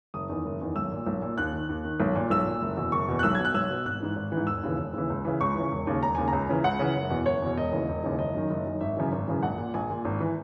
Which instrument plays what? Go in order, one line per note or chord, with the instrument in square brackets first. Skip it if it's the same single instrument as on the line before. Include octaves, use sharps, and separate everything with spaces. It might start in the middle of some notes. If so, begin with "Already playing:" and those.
[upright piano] F#1 D#6
E2 D#3
F#1
E2 D#3
B1 E6
A#2
B1
A#2
D#2 F#6
D#3
D#2
D#3
B1
A#2
B1 E6
A#2
F#1
E2 B2
F#1 C#6
E2 B2
F#6
B1 E6
B2 G#6
F#6
B1 E6
B2
G#1 F#6
G#2 E3
G#1
G#2 E3
E1 E6
D#2 C#3 E3
E1
D#2 C#3 E3
C#2
C#3 E3
C#2 C#6
C#3 E3
E1
D#2 C#3
E1 A#5
D#2 C#3 G#5
C#2 A#5
C#3 E3
C#2 F#5
C#3 E3
F#1
E2 B2
F#1 C#5
E2 B2
E1 D#5
D#2 C#3 E3
E1
D#2 C#3 E3
F#1 D#5
F#2 D#3
F#1
F#2 D#3
G#1 E5
F#2 C#3 E3
G#1
F#2 C#3 E3
A#1 F#5
A#2
A#1 G#5
A#2
G#1
E3